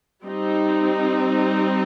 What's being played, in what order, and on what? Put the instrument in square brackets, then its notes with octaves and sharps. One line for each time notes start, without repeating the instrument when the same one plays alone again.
[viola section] G3 C4 D#4